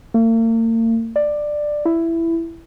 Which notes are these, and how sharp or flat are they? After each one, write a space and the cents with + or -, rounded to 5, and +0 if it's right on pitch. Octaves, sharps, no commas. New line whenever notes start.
A#3 -45
D5 +10
E4 +10